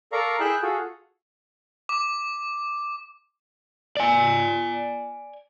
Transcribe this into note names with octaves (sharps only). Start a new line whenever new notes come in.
A4 A#4 D5 F5 A#5 C#6
E4 G#4 E5 G5 F#6
F4 F#4 G#4 A4
D6
D5 G#5